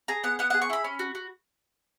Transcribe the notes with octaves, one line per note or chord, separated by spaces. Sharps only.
G#4 A#5
B3 F#5
B3 F#5
G#4 F#5
C#6
E4 B5
C#4
F#4
F#4